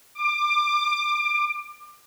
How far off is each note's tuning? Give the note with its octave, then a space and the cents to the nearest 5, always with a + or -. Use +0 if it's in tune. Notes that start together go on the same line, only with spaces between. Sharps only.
D6 +25